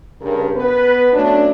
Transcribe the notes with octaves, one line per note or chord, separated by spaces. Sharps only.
G2 C#3 A#4
B3 B4
F#3 A3 C#4 D4